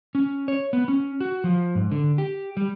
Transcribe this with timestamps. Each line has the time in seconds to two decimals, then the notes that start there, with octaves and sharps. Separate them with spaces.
0.15 C#4
0.48 C#5
0.73 B3
0.88 C#4
1.21 F#4
1.44 F3
1.75 G#2
1.91 D3
2.18 G4
2.57 G3